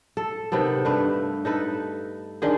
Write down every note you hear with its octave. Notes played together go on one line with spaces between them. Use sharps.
A4
C3 D#3 B3 A4
G2 A3 B4
D#4 A4 B4
D3 D#3 G#4